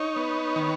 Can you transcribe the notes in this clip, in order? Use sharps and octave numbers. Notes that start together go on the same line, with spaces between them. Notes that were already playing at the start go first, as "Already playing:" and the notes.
Already playing: D#4 C#5
B3
D#3